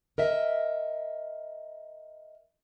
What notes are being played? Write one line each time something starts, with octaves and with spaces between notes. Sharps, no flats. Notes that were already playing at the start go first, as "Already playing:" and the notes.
A#4 D#5 E5